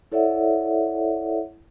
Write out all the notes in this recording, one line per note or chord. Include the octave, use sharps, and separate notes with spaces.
E4 A4 C#5 D5 E5 F#5